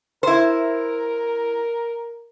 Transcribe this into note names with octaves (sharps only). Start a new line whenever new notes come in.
E4 A#4 C5